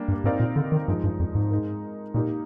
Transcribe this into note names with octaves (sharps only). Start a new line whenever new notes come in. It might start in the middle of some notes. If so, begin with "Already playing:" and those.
Already playing: G3 A#3 D4
G2
G#2 C4 D#4 A#4 D5 F5
A#2
D3
D#3
G2 F3 G#3 D#4
G2
F2
G#2
G#3 D#4 A#4
A#2 A#3 D#4 G4 A#4